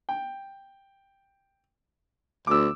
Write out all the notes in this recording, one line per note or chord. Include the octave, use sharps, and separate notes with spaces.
G5
D2 D6 E6